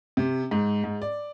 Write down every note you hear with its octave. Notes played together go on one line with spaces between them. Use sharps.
C3
G#2
G#2
D5